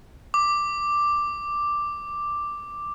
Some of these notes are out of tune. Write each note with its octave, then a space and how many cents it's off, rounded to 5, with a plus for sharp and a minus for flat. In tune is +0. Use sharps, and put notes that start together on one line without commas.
D6 +5